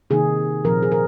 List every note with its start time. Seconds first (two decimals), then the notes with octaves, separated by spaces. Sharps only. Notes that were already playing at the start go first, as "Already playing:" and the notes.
0.10 C3 D#3 A#3 D#4 G#4
0.64 A#2 F3 C4 A#4
0.83 G#4
0.92 A#4